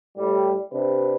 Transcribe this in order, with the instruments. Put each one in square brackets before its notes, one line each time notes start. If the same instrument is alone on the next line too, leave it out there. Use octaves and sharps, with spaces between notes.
[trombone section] A2 G3
C3 D4 B4